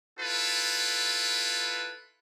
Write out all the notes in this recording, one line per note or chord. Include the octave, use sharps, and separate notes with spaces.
E4 F4 A4 B4